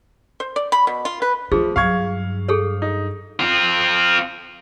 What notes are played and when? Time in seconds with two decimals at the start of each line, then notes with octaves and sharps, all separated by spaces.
0.40 C5
0.56 D5
0.72 B5
0.87 B2
1.05 F4
1.22 B4
1.52 F3 A3 G#4
1.76 G2 F#3 F5 C#6 G#6
2.48 G#4 A4 C#5
2.82 D#4
3.40 C4 F4